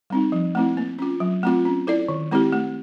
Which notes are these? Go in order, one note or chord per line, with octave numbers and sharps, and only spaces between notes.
G3 C4 D#4
F3
A3 C4 E4
A#3
C#4 F4
F#3
A3 C4 F4
C#4
E4 A4 D5
D#3
G#3 C4 E4 G4
A3